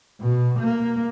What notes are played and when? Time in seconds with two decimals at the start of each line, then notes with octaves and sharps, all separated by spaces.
0.21 B2
0.59 A#3